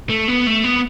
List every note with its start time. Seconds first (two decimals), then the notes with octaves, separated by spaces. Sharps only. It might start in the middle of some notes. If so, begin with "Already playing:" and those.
0.10 A3
0.28 B3
0.47 A3
0.64 B3